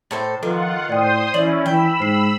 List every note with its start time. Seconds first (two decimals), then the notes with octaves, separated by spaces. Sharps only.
0.11 A2 A4 C5
0.43 D#3 F3 F4 A4 B4 F#5
0.90 A2 C5 D5 G5 C6 D#6
1.34 E3 C#4 E4 D5 F#7
1.66 E3 G5 B5 E6
2.00 G#2 C5 C7